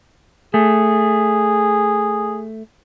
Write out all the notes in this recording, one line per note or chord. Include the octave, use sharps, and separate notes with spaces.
A3 G#4